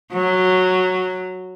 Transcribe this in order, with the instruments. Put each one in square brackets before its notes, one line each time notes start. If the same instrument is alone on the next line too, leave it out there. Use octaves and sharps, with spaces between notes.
[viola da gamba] F#3